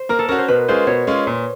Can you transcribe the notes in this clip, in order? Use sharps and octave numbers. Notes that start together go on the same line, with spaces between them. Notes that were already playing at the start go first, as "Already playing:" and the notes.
Already playing: C5
A#3 A#4
A4
C#4 F#4 A#4
C5
B2 B4
G#3 C#4 F4 G#4 C5
B2 C#5
G#3 C#4 F4
A#2